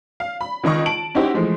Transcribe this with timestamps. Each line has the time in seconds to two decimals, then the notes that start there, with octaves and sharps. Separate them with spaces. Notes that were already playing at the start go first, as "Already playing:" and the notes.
0.20 F5
0.41 B5
0.63 C#2 D#3 D#5 C#6
0.86 A5 D7 F#7
1.15 C#4 D#4 E4 F#4 G4 C5
1.34 E3 F3 G#3 A3